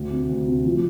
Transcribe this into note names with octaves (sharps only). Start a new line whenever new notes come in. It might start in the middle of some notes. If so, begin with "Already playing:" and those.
Already playing: D2
C3
D2
C3
F3